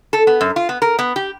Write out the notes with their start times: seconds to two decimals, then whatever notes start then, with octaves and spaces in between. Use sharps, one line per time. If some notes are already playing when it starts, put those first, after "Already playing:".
0.13 A4
0.27 B3
0.41 F#2
0.56 F4
0.69 B3
0.82 A#4
0.99 B3
1.16 G4